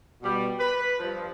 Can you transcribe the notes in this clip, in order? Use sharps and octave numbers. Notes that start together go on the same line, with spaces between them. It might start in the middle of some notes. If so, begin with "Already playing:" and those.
B2 G3
B4
G2 F3